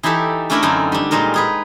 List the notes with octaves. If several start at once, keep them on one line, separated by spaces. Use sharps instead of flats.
E3 D#4 E4 G4 A4
A3 C#4 D4 E4 A#4 D5
F#2 D3 C4 D#4 E4
G3 D4
A#2 G3 G#3 D#4 A#4
D#4 G#4 B4